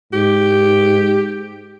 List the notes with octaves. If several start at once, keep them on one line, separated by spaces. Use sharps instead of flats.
G#2 G4